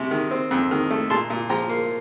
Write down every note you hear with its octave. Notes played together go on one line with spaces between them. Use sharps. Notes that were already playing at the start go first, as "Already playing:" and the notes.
Already playing: C2 C3
D#3
C4
F2
D#3
A3
A#2 A5 C6
A#2
F3 G5 A#5
A#3